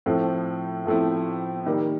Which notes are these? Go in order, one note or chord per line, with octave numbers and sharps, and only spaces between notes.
A2 F3 A3 C4 E4
A2 F3 A3 C4 E4
D#3 G3 A#3